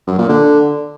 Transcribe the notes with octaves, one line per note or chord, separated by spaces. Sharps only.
F#2
A#2
D3